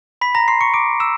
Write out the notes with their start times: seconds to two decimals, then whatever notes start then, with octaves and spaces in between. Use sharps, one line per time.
0.21 B5 B6
0.35 A#5 A#6
0.48 C6 C7
0.61 C#6 C#7
0.74 D6 D7
1.00 E6 E7